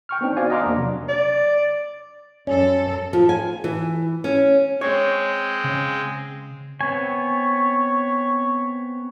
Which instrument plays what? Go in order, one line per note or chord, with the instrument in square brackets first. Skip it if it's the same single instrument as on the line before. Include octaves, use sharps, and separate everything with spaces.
[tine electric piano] G5 C#6 F6
B3 C4 D4 D#4
F#4 C5 D5 F5 G#5
D#5 F#5 A#5 C6 D6 F6
E2 A#3 D4
C3 F#3 D4
[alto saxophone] D5
[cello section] F#2 A4 [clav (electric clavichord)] C#4
[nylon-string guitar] F3
G#5
E3
C#4
[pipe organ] G#3 C4 [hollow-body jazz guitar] C#5
[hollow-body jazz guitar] C#3
[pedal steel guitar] B3 C4 G#5 [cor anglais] C#5